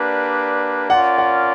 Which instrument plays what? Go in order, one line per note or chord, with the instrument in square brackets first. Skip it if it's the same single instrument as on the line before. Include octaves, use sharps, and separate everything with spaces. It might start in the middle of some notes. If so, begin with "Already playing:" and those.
Already playing: [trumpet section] A#3 D4 G4 B4 [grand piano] D5
[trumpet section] C#4 F4 A#4 D5 [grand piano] F#5
[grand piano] F#5